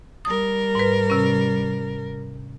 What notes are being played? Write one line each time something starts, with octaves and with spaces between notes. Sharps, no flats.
G3 A#4 D#6
G#2 B4
C3 C#4